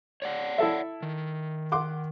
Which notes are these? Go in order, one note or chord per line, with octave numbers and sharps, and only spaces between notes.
C#5 D5 F#5
E4 A4 E5
D#3
F#5 C6 D6